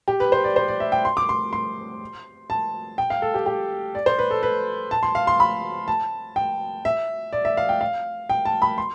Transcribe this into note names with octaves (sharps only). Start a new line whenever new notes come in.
G4
B4
C5
D5
C5
D5
E5
G5
C6
D6
C6
C6
A5
G5
F5
A4
G4
G4
D5
C5
B4
A4
B4
A5
C6
F5
C6
B5
A5
G5
E5
D5
E5
F5
G5
F5
G5
A5
B5
C6